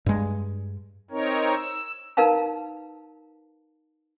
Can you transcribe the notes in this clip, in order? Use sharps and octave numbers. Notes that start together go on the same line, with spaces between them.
G2 G#3
C4 D#4 A#4 C#5
E6
D#4 A#4 B4 F5 A5 A#5